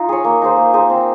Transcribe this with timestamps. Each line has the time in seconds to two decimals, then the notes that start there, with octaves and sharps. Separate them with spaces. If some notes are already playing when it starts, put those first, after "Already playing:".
Already playing: D#4 F4
0.09 G#4 C#5
0.24 A#3
0.42 D#4 G#4 C5
0.57 A#3
0.74 D#4 G#4 C5
0.90 C4